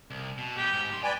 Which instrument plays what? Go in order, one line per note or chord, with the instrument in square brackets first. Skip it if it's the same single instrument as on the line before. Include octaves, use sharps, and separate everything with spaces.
[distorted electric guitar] C2
B2
[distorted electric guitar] G#3 B3 [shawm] G4
[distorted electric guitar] G#2
C2 C6
[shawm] B4 [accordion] D5 G#5 [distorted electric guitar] G5